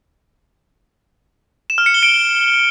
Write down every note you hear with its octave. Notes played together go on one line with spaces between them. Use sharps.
E7
F6
C#7
G7
D7